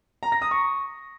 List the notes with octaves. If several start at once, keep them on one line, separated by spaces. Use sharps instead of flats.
A#5
A#6
D#6
C#6